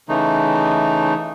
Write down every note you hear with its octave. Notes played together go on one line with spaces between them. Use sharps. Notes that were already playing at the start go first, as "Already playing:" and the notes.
C#3 E3 A3 D#4